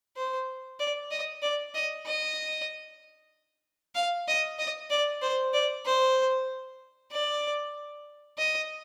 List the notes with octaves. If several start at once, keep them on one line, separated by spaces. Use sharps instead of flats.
C5
D5
D#5
D5
D#5
D#5
F5
D#5
D#5
D5
C5
D5
C5
D5
D#5